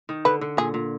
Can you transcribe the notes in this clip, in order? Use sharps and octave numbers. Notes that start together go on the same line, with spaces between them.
D#3
D3 B4
D3
A#2 G#4
A#2